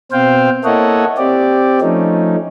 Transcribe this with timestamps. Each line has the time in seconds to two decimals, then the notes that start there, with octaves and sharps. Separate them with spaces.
0.12 B2 C4 C5 F5 G5
0.64 A#3 E4 A4 C#5 D#5 F#5
1.18 C4 G4 D5
1.81 F3 A3 C#4 D#4